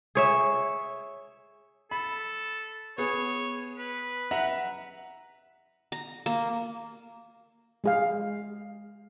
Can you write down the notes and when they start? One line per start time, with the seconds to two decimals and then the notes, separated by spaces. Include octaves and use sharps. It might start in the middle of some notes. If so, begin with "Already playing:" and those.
0.15 G#4 C#5 E5
1.91 A4 B5
2.98 B3 G#4 C#5
3.77 B4
4.31 E5 F#5 A#5
5.92 A#5
6.26 A#3
7.84 G#3 G#4 F5